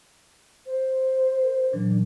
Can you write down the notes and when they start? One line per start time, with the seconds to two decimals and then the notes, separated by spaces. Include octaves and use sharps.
0.66 C5
1.43 A#4
1.73 A#2 E3 F#3 D4